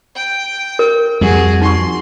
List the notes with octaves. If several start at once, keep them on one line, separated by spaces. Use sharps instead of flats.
G5
A#4
F2 G3 F#4 G#4
D#4 C6 C#6